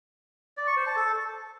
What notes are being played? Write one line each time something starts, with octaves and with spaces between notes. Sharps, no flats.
D5
C#6
C5
A5
A4